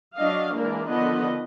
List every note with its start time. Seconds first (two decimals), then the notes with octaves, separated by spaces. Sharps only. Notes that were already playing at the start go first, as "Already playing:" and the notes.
0.15 F#3 D4 D#5 F5
0.55 E3 G#3 A#3 D4 A#4
0.87 D3 D#3 F3 B3 B4 D#5